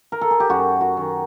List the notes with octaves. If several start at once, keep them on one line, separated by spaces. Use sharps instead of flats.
A#4
A4
G#4
G4
F#2 F#4
F#4
D#3